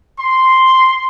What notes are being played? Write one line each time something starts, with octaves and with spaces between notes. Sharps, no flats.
C6